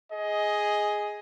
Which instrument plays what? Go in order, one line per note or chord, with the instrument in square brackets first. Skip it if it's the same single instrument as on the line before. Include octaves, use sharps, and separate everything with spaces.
[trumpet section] G#4 D#5